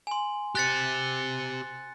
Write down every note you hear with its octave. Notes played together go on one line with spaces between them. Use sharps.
G#5 C6
G4 C5 F#6 A6 C#7